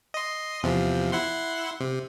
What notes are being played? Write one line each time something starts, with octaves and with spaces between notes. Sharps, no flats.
D#5 C6
E2 C3 F3
E4 F#5 C6
C3